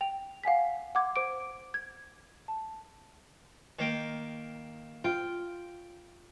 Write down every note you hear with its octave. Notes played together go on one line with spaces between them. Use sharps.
G5 F7
F5 F#5 G#5 B6
F#5 C6 D6 G#6
C5 D6 D7
G#6
A5
D#3 A#3 G5
F4 G5